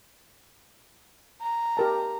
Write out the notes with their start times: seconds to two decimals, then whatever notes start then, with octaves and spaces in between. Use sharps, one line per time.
1.41 A#5
1.77 G4 A#4 A5